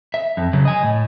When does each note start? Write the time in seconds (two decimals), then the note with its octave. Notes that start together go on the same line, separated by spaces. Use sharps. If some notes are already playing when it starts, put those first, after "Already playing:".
0.14 E5
0.37 F2
0.53 C#3 F#3
0.65 D#5 G#5
0.83 A2